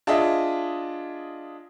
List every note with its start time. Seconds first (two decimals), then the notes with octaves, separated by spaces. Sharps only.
0.07 D4 F4 G#4 D#5 E5